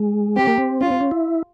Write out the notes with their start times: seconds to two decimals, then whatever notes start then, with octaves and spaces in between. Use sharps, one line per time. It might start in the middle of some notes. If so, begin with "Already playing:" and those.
Already playing: G#3
0.36 C4 G4
0.47 A#3
0.58 C4
0.81 C#4 F4
0.91 C4
1.01 C#4
1.11 E4